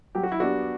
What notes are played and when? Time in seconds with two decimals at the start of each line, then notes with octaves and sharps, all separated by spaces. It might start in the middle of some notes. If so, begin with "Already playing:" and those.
0.15 F#3 G4
0.23 F#4
0.32 E4
0.40 B3 D4 F#4 G4